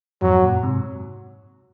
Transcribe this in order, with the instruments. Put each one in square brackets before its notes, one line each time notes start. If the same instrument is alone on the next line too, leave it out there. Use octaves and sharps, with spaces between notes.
[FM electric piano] F2 G#2 [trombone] F#3
[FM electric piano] F#2 A#2
G#2 C3